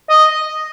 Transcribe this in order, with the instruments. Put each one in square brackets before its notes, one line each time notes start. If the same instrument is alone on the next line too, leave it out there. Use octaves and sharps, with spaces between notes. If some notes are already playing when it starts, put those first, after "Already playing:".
[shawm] D#5